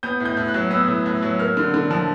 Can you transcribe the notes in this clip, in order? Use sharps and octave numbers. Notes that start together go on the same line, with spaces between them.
B3 G6
A2
G6
A2
F#6
F#3
B3 E6
A2
A2
F#3
A#3 F6
D3
D3
F3